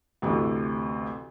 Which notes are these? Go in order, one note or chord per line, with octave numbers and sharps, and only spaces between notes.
A1 D2 C3